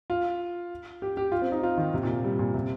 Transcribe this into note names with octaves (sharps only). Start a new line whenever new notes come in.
F4
G4
G4
F4
C4
D#4
F4
D#3
C3
A#2
G3
A#2
C3